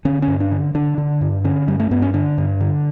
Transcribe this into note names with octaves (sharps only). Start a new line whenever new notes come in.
D3 C#4
C#4
G2
D4
D3
D3 D4
D3
G2
D3 C#4
G2 G3
A3
G2 B3
C#4
D3 D4
G2
D3